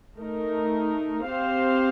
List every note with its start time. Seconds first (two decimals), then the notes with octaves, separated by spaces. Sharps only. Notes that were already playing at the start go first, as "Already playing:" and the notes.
0.19 A3 D#4 A#4
1.25 C4 G4 C5 F5